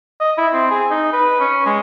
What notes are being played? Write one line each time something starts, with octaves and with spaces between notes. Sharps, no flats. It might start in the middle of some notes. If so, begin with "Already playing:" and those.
D#5
E4
C4
G#4
D#4
B4
C#4
G#3